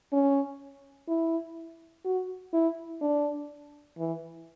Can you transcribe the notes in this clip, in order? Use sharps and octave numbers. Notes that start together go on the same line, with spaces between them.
C#4
E4
F#4
E4
D4
E3